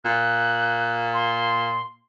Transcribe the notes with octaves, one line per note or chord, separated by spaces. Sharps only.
A#2 F#6
C6